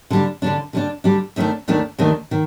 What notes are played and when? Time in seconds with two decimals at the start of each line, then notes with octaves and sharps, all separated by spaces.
0.10 D3 G3 D4
0.42 D3 G3 D4
0.73 D3 G3 D4
1.04 D3 G3 D4
1.36 D#2 D#3 A3 D4
1.68 D#2 D#3 A3 D4
1.98 D#2 D#3 A3 D4
2.31 D#3